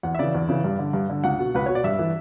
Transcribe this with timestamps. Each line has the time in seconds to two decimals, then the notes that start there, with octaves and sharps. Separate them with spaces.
0.03 E2 F#5
0.14 E5
0.19 C#3 E3 D5
0.34 E2
0.49 C#3 E3
0.64 G2
0.79 D3
0.93 G2
1.10 D3
1.24 C#2 F#5
1.39 B2
1.55 C#2 B4
1.66 B2 C#5
1.75 D5
1.84 G2 E5
1.99 E3